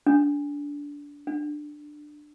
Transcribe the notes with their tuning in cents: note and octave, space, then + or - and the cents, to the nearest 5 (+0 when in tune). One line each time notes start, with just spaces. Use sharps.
D4 -20
D4 +15